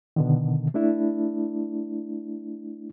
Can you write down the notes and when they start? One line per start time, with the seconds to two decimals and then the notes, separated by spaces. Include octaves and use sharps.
0.16 B2 D3 D#3
0.74 A3 D4 E4